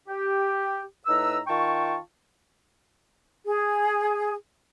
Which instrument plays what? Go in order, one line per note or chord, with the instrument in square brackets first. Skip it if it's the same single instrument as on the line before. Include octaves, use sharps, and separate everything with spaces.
[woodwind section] G4
A2 D#4 B4 A#5 E6
D#3 F4 G5 A5 C#6
[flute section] G#4